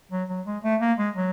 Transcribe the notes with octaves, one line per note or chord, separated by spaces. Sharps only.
F#3
F#3
G#3
A3
A#3
G#3
F#3